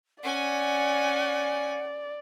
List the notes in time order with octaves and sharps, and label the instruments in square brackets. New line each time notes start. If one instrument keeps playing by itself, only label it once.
[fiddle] C#4 G#5 [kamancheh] D5 [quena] F#5